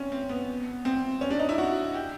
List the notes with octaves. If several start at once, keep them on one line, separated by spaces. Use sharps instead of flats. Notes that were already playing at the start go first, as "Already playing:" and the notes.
Already playing: C4 C#4
C4
B3
C4
C#4
D4
D#4
E4
F#4
G4